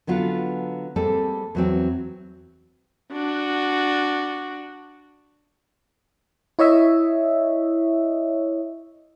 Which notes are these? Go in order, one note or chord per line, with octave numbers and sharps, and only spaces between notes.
D3 F#3 B3 F4
G3 G#3 A#3 C4 A4
E2 F#3 C4
D4 F#4
E4 C#5 D#5 E5